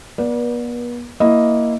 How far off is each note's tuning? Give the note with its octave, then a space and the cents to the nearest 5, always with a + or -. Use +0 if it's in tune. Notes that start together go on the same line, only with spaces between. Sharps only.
B3 -35 B4 -45 D5 +0
A#3 +0 E4 +0 D#5 +0